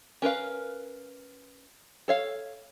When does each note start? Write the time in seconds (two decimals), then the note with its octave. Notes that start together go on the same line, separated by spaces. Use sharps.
0.22 C#4 A#4 B4 F5
2.08 A4 C#5 F5